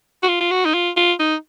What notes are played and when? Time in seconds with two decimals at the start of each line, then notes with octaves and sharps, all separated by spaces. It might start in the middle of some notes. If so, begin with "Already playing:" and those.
0.23 F#4
0.28 F4
0.40 F4
0.51 F#4
0.65 D#4
0.74 F4
0.97 F4
1.19 D#4